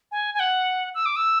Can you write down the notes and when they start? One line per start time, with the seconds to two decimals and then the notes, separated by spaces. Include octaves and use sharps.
0.12 G#5
0.34 G#5
0.40 F#5
0.95 E6
1.06 D6
1.16 E6